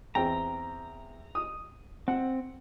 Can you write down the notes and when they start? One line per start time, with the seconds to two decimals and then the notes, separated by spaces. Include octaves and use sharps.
0.15 E2 C4 G5 A#5
1.35 D#6
2.08 C4 F#5